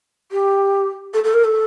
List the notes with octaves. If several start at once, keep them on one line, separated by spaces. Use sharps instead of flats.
G4
A4
A4
A#4
A4